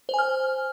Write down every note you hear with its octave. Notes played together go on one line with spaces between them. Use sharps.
C5 G#5 F6